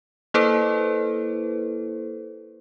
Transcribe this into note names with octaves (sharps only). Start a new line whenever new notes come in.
A#3 E4 A4 B4 C5